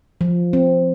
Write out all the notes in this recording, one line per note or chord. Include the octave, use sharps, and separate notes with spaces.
F3
C4